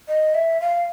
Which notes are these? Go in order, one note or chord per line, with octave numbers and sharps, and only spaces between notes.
D#5
E5
F5